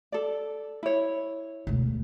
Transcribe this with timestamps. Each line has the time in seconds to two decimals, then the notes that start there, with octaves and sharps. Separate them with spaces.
0.12 A4 D5
0.83 E4 C#5
1.67 E1 D2